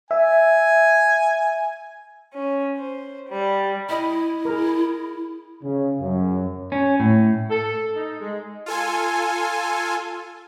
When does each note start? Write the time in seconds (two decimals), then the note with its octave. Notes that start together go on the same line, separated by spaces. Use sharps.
0.11 E5 G#5
2.33 C#4
2.76 C5
3.27 G3
3.89 E4 D#5 B5
4.45 G#4 A#4
5.63 C#3
6.01 F#2
6.72 C#4
7.00 A2
7.50 A4
7.96 D#4
8.21 G#3
8.66 F4 A4 G#5